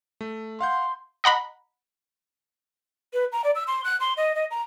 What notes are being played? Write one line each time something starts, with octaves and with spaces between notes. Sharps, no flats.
A3
F5 F#5 C6 G6
D#5 F#5 A#5 B5
B4
A#5
D5
E6
C6
F#6
C6
D#5
D#5
A#5